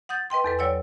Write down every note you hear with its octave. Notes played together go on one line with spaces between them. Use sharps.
F#5 D#6 G6 A6
B4 D#5 G5 C6
E2 A4 B4
F#3 C#5 D5 G5 E6